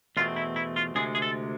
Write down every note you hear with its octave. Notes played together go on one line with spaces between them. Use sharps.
E2 B2 A3 C4 F4
E4
E4
F4
D2 C3 G#3 G#4
G#4
A4